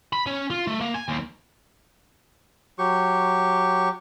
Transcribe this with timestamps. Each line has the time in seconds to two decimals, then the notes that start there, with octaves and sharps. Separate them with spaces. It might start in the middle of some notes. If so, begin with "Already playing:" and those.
0.13 B5
0.27 C#4
0.50 F4
0.67 A3
0.81 A#3
0.94 G#5
1.09 D#2
2.79 F#3 G4 C#6